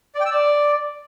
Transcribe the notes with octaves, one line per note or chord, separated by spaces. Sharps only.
D5
G5
E6
D5